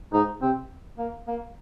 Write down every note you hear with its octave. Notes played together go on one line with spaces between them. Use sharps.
G#2 D#4
C3 C4
A#3
A#3